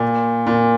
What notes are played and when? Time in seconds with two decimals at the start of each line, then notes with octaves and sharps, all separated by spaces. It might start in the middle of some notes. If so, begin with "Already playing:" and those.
Already playing: A#2
0.47 A#2